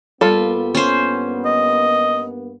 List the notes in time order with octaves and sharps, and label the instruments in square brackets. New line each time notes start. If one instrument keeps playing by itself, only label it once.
[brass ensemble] G2 A#3 B3 [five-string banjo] G3 F4 A4
[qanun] C#4 C5
[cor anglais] D#5